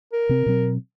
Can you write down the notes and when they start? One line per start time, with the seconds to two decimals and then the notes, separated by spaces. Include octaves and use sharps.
0.13 A#4
0.29 C3 C4
0.46 B2 F#3 C4